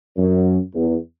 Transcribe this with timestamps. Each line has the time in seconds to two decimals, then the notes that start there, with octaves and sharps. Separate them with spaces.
0.17 F#2
0.75 E2